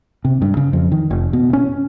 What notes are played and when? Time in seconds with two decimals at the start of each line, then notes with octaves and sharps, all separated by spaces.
0.25 C3
0.42 G2
0.57 C#3
0.73 F2
0.92 D#3
1.10 F1
1.33 B2
1.53 C#4